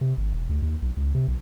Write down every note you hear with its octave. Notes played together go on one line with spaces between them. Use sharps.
C3
G#1
E1
D2
D#2
B1
C#2
C3
B1